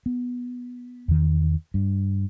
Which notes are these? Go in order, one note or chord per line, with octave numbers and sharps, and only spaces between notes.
B3
E2 D#3
G2